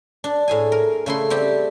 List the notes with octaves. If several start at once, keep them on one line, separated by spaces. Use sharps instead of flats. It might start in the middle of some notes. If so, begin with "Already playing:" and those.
D4
A2 G#4 G#5
A#4
C#3 A3 E4 C6
G3 C4 G4